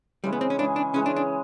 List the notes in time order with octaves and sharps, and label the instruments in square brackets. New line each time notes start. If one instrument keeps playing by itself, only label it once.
[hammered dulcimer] C#3 E3 G#3 [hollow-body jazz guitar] G3
[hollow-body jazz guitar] B3
C4
C#4
[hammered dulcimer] C#3 E3 G#3 [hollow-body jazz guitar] D4
[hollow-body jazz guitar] D4
[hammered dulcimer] C#3 E3 G#3 [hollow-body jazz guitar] C#4
[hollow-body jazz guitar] D4
D4